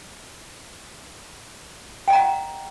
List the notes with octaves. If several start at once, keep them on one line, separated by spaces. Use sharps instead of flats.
D#5 F#5 G5 A#5